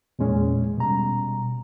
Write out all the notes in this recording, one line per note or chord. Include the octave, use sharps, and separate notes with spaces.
E2 A#2 G#3 C#4
B2 G3 A#5